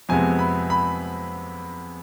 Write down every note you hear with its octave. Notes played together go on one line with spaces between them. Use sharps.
F2 C3 G#3 B3 G#5
B5
B5